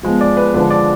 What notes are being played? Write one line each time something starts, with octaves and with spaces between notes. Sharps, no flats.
F3 G#3 B3
D5
B4
D3 F3 G#3 D4 B4
D5